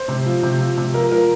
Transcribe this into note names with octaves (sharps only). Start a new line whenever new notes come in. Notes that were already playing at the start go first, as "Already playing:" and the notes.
Already playing: C5
C3
F3
C3
F3
C3
F3 A#4
F3 A#4